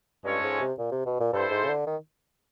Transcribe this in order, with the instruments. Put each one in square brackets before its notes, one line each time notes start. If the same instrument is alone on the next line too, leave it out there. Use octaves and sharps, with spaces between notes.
[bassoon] G2 [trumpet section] G#3 C#4 F4 A4 C#5
[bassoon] G#2
C3
A#2
C3
B2
A#2
[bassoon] G2 [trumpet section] E4 A4 C5
[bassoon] G#2
C#3
D3
D#3